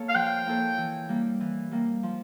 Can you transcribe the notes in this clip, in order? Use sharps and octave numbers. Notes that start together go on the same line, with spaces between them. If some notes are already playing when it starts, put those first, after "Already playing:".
Already playing: A#3 A4 C#5
F5
F3 G5
A#3 E4 A4 C#5
E3
G3 A#3
E3
G3 A#3
F3